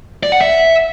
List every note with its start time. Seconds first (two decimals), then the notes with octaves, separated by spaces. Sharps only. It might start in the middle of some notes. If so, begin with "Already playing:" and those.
0.23 D5
0.32 F#5
0.41 E5